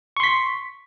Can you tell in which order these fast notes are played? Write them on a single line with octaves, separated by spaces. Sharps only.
C#6 C6 B6